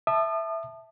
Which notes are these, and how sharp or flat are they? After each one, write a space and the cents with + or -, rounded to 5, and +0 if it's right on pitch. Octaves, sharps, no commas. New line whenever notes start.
E5 +0 A5 +0 D#6 -40